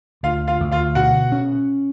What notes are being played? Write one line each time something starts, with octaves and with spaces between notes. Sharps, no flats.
D2 F4 F5
F4 F5
D2
F4 F5
B2 F#4 F#5
C#4